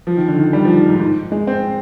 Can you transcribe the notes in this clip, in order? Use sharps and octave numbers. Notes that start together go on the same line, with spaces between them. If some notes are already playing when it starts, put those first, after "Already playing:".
F3
D#3
D3
D#3
G3
F3
D#3
G#2
G#2
G#3
C4